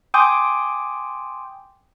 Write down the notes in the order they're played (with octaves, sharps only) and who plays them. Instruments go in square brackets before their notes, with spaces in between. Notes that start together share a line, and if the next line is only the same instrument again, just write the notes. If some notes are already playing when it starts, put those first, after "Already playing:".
[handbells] G5 G#5 C6 D6 D#6 G6